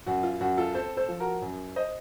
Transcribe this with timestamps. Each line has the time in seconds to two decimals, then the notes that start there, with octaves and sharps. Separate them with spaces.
0.06 F#2 F#4
0.23 F4
0.41 F#2 F#4
0.57 F4 A4
0.74 C4 A4 C5
0.97 A4 C5
1.08 F3
1.20 F#4 A#4
1.42 F#2
1.76 C5 D#5